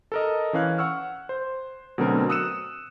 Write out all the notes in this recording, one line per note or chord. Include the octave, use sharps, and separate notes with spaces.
A4 A#4 D#5
E3 C#4 F5 F#6 G#6
F#5 C#6 E6 F6
C5
B2 D3 F#3 A3 C4 A#4
D#6 E6 F#6 C#7 D#7 E7